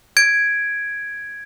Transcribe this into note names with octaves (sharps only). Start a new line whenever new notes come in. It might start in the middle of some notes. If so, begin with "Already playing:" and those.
G#6 D7